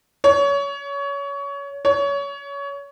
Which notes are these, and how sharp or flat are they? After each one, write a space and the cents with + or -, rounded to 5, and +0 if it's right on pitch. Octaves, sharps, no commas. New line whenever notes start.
C#5 +25
C#5 +25